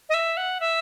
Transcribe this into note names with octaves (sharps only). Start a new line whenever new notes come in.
D#5
E5
F#5
E5